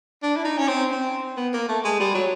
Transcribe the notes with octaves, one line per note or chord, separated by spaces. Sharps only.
D4
E4
D#4
C#4
C4
C4
B3
A#3
A3
G#3
G3
F#3